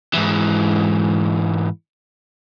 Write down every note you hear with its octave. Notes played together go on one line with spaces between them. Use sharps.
G#2 E3